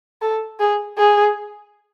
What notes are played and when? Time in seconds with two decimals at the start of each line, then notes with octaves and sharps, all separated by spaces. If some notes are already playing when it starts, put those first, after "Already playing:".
0.22 A4
0.60 G#4
0.98 G#4